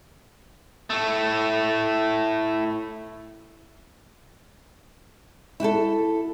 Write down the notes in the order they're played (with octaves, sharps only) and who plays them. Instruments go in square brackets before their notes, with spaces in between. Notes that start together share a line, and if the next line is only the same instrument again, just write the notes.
[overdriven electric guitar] A2 A3
[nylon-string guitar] E4 F#4 G4 A4